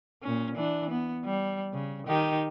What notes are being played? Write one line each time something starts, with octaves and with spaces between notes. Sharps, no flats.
A#2 C#4
E3 D4
B3
G3
C#3
D#3 D#4 G4